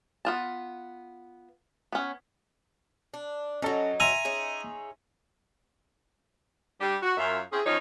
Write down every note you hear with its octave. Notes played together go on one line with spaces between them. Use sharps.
B3 F4 A5
B3 C#4
D4
F#3 C#4 D#4 A4
E5 G#5 A#5 C6 E6
C#4 D#4 G#4
G3 D4 G4
F#4
F#2 F4 E5
C4 C#4 E4 G#4
F#2 F3 C#4 D#4 F4 C#5